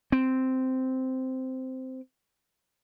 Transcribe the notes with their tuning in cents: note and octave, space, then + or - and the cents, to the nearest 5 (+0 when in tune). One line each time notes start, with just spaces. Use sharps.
C4 -10